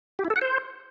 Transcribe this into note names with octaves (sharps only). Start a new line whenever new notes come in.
G4
E4
A4
F#5
C5